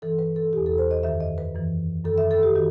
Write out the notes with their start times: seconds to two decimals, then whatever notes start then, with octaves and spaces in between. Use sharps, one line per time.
0.02 G2 E3 A4
0.19 B4
0.36 A4
0.53 B2 G4
0.58 E2
0.66 A4
0.78 C5
0.91 D#5
1.03 F#2 D#3 E5
1.20 D#5
1.38 B4
1.54 F#2 E3
2.05 F#2 D#3 A4
2.18 E5
2.31 A4
2.43 G4
2.56 D#3 F#4